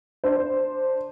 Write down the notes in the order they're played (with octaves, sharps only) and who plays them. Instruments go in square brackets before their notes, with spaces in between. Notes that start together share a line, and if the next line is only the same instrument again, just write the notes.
[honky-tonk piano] D4 C5